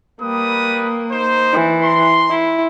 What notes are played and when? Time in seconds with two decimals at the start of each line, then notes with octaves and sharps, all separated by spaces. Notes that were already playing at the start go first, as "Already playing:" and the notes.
0.21 G3 A#3 B4 D#6
1.11 D#4 C5
1.53 E3
1.82 A#5 C6
2.30 E4